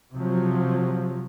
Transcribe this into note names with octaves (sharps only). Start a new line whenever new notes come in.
C3 F3 F#3